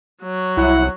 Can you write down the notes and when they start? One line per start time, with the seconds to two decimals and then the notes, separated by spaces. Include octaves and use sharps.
0.23 F#3
0.57 C2 E4 F#5